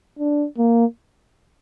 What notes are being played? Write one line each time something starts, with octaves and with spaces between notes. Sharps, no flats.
D4
A#3